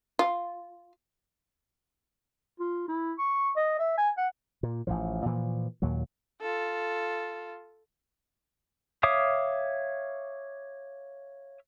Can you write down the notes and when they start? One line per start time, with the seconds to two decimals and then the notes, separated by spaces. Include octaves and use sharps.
0.19 F4
2.60 F4
2.88 E4
3.19 C#6
3.57 D#5
3.79 E5
3.97 G#5
4.18 F#5
4.63 A#2
4.87 A1 A2 F3
5.26 A#2 E3 F3
5.82 D#2 A#2 F#3
6.41 F4 A4
9.03 C#5 E5 F5 D6 D#6